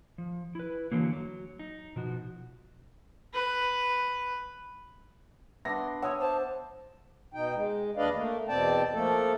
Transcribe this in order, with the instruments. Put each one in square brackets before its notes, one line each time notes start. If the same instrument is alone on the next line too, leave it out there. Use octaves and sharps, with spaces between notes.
[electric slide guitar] F3
E4 B4
D3 E3 F#3 A#3
F#3
D#4
B2 F3 F#4
[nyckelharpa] B4
[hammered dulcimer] B3 D4 C6 [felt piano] E5 A#6
[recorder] C#5 [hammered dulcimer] E5 [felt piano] F#5 D#6
[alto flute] C5 [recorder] A5
[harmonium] B2 D#4 G5
G#3
D#2 D4 B4 D5 D#5 F5
A3 A#3
E2 B2 C4 D5 G5 A5
F3 A3 A#3 A4